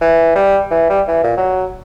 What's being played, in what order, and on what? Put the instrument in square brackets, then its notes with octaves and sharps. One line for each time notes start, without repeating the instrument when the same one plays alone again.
[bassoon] E3
G3
E3
G3
E3
A#2
F#3